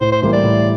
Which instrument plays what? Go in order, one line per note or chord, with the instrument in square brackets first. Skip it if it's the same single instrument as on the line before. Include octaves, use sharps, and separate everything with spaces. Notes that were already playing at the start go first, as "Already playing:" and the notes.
[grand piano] A2 [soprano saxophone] C5
[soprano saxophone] C5
[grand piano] E3 G3 A#3 [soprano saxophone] C5
[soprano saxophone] D5
[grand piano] A2